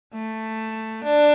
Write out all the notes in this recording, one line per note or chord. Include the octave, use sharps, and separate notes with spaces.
A3
D4